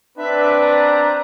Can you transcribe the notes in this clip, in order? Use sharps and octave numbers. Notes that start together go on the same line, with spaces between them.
C4 D4 B4 E5
A#5